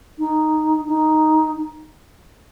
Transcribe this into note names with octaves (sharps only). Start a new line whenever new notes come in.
D#4
D#4